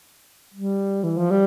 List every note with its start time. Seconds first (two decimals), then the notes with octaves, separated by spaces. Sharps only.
0.54 G3
1.04 E3
1.17 F3
1.31 G3